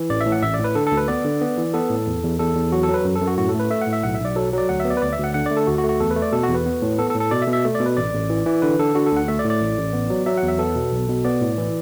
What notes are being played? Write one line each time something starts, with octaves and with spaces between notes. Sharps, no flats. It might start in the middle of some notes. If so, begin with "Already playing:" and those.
Already playing: E3
A1 D5
E5
A2
F#5
A1 E5
D5
A2
B4
D3 A4
A4
D2
B4
B3 D5
D3
B3
E3
B3 A4
A2
E2
E2
E2 A4
E2
F#3 F#4
A4
F#3
B4
F#2
A4
F#2
F#4
A2 F#4
A4
A3
B4
A3 E5
F#5
A2
E5
B1 F#5
B1 E5
D5
F#3 A4
F#3 D5
D2 F#5
E5
B3
D5
B4
D2 D5
E5
D2
F#5
D3 F#5
A3 D5
A4
D2 F#4
F#4
A3
F#4
E2 A4
B4
A3
D5
B2 A4
F#4
E2
B4
B3
A2
B3 A4
A4
A2
A4
B2 D5
E5
B2
E5
A3
B2 D5
B4
A1 D5
A1
E3
E3
D3 B4
D3 A4
D3 F#4
A4
D2 F#5
A3 E5
D5
A2
D5
A1
A1
B3
F#3
F#3 E5
F#5
E2
E5
B3 A4
B2
B1
B2
B3 D5
A2
E3